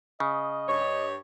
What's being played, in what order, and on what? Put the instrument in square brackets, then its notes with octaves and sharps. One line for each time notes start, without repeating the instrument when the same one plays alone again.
[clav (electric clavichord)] C#3 [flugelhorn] D#5
[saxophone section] G2 C#5